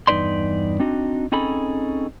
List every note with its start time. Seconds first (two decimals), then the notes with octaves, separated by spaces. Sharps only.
0.07 E2 G2 D#4 B4 D5 C6
0.80 C4 D4 D#4 F#4
1.32 C4 C#4 D#4 G#4 A4 B5